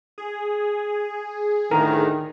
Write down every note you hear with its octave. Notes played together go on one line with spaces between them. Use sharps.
G#4
D2 A2 D#3 A#4